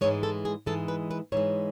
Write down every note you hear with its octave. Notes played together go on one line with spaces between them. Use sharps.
G#2 E3 G#3 C#5
A4
G#4
G#2 E3 G#3 A4
B4
B4
G#2 E3 G#3 C#5